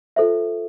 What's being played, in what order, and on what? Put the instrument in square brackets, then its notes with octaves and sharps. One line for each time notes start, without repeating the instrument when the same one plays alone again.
[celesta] F4 A4 C5 E5